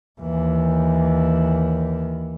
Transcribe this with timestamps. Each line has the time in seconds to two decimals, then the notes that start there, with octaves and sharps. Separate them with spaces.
0.21 D#2 E3